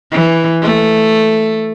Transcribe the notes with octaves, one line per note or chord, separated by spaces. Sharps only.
E3
A3